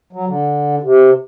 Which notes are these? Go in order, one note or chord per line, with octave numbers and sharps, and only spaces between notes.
F#3
D3
C3